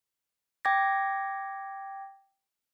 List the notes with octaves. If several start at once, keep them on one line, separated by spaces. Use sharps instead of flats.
G5 D6 G#6 A#6